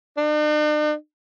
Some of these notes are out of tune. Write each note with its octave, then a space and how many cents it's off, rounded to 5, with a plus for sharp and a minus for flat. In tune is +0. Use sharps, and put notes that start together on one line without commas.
D4 +45